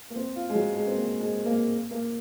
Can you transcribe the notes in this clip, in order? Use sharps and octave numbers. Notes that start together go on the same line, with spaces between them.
A#3
C4
F4
G#3
F#3
G#3
C4
A#3
G#3
A#3
A#3